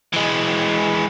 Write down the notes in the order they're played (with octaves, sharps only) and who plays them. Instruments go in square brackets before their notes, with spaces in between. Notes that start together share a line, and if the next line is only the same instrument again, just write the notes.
[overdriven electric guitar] E3 G#3